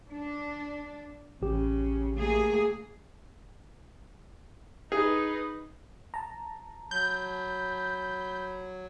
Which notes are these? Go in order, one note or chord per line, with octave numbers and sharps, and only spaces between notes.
D4
A1 C#3 G4
A3 A#3 G#4
D#4 G#4 B4
A5 A#5
F#3 B5 G6